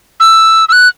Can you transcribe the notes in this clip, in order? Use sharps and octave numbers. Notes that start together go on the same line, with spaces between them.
E6
E6
F#6